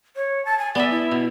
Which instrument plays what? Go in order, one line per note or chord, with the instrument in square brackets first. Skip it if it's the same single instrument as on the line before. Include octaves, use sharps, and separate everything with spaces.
[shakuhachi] C#5
A5
G#5
[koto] B3 E5 [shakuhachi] D5
[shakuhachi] E4
[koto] B2